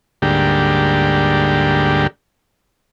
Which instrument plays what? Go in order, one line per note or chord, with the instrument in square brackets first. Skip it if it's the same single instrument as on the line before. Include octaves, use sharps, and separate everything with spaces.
[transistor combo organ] D2 G#2 D3 G3 A#3 G4